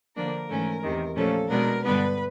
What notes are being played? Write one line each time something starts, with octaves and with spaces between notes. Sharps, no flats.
D3 F3 A#3 D4 A#4
G#2 E3 A3 C#4
E2 C3 D#3
A#2 F3 A3 C#4 A4
B2 G#3 B3 D4 A#4
G2 D3 G3 B3 D4 B4